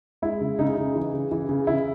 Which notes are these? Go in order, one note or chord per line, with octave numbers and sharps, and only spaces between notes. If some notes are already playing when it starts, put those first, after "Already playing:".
G#3 E4
C#3
C#3 D#4
C#3
E3
C#3
E3
C#3
C#3 E4